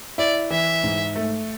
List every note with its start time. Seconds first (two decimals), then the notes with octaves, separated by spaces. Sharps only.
0.18 E4 D5
0.50 E3 E5
0.83 G#2
1.16 A3